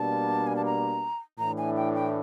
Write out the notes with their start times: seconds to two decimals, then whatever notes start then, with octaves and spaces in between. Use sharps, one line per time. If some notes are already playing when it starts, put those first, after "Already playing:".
Already playing: B2 G3 A#3 D4 A5
0.47 G#5
0.56 A5
0.65 A#5
1.39 A2 E3 A3 D4 A#5
1.58 G#5
1.76 G5
1.95 G5